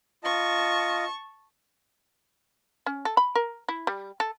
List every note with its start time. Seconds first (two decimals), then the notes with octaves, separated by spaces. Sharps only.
0.24 F4 D#5 A5 C#6
2.86 C#4
3.05 A4
3.17 B5
3.35 A#4
3.69 E4
3.87 G3
4.20 A4